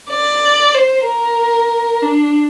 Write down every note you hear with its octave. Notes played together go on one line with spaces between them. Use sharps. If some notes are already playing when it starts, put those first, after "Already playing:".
D5
C5
A#4
D4